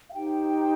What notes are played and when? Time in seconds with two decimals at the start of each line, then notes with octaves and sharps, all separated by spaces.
0.08 F5
0.13 D#4 G4 C5 G5